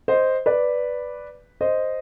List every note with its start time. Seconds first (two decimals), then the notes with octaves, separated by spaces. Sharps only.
0.08 C5 D#5
0.46 B4 D5
1.61 C5 D#5